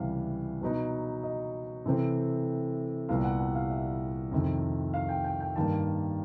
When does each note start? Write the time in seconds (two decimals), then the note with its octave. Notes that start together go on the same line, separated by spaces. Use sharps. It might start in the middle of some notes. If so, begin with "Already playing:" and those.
Already playing: C#2 C3 E3 G3 F5
0.61 B2 F#3 B3 D#4
1.23 D#5
1.86 C3 E3 A3 C4
3.09 C2 A#2 G3 B3 F5
3.24 F#5
3.40 F#5
3.55 F5
3.71 E5
4.32 F2 C3 D#3
4.94 F5
5.09 G5
5.24 G5
5.40 G5
5.56 G2 D#3 G3 A#3 A5